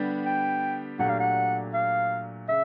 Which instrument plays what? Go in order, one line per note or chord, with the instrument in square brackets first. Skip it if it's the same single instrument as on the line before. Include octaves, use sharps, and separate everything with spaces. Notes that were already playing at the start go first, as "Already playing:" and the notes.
Already playing: [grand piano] D3 G3 B3 D4 G4
[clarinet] G5
[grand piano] A#2 F#3 A3 D4 G4 [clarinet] F#5
[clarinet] F5
F#5
F5
[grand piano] C#3 [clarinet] E5